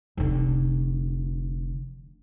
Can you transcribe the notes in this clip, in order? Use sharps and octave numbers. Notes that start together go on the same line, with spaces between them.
F1 D3